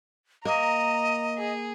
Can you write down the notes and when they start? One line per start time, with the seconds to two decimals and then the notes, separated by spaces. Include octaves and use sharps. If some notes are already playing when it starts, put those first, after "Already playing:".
0.45 A#3 D#5 A#5
1.38 G#4